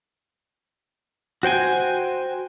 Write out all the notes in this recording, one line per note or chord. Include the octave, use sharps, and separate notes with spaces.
F#4 C5 G5 G#5